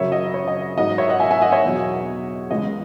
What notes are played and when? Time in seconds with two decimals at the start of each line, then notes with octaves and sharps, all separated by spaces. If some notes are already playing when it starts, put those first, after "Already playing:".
Already playing: F#2 C#3 F#3 C#5 E5
0.12 D#5
0.34 C#5
0.48 D#5
0.77 G#2 F#3 D#5
0.98 C#5 E5
1.09 D#5 F#5
1.20 E5 G#5
1.31 E5 G#5
1.41 D#5 F#5
1.52 C#5 E5
1.63 E2 B2 F#3
2.50 C#2 C#3 E3 G#3 D#5